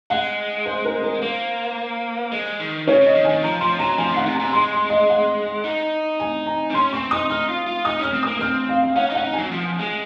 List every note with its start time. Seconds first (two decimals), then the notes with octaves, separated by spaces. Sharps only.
0.10 G#3 F#5
0.66 C5
0.85 A#4
1.02 A#4
1.21 A#3 C5
2.32 G#3
2.60 D#3
2.88 C#3 C#5
3.01 C#3
3.06 D#5
3.15 D#3
3.25 G#5
3.29 D#3
3.43 F3 A#5
3.61 F3 C6
3.79 F#3 A#5
3.98 F3 G#5
4.11 D#3 F#5
4.26 C3
4.35 A#5
4.40 C3
4.53 G#3 C6
4.72 C6
4.90 D#5
5.09 F#5
5.64 D#4
6.20 G#5
6.46 A#5
6.70 C4
6.74 C#4 C6
6.93 C4 C#6
7.11 D#4 D#6
7.30 D#4 F6
7.49 F4
7.67 F4
7.85 D#4 D#6
7.99 C#4 F6
8.13 C4
8.23 D#6
8.27 A#3
8.40 C4 F6
8.69 F5
8.83 F5
8.96 C#4 F#5
9.10 D#4
9.14 F#5
9.17 C#4
9.24 D#4
9.33 F#3 G#5
9.52 F3
9.79 G#3